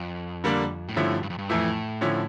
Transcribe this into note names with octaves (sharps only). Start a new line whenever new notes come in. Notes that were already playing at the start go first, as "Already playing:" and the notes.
Already playing: F2
D3 G3 A#3 D4
A2
G2 D3 F3 A3 C#4 E4
G2
F2
G2
F2 A2 E3 A3 E4
D3 F3 C#4 E4